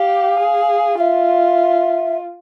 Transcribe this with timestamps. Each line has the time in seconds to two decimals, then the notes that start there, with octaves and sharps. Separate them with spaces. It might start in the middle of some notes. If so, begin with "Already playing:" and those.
Already playing: G4 F5
0.39 G#4
0.97 F4 E5 F5